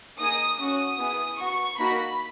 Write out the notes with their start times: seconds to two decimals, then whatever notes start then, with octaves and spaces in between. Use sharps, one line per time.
0.19 A#3 D#4 G#4 D#6
0.59 C#4 F#4 D#6
0.99 B3 E4 G#4
1.39 B3 F#4 C#6
1.78 A#3 D#4 F#4 B5